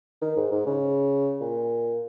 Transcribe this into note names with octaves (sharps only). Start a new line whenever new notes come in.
D#3
G#2
G#2
C#3
A#2